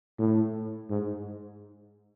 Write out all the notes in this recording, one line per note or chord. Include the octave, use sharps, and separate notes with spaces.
A2
G#2